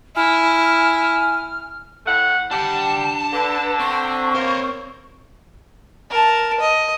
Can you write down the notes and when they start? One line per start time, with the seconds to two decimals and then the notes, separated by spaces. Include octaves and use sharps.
0.16 E4 G#5 F6
2.06 A2 A3 F#5
2.51 G3 D4 F#5 A5
3.33 D3 B4
3.80 C4 C#6
4.35 A#3 C5 C#5
6.10 A#4 A5
6.60 D#5